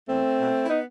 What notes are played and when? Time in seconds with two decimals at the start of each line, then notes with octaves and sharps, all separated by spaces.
0.09 E2 A3 C4
0.39 B2
0.64 E4
0.69 B3 D#4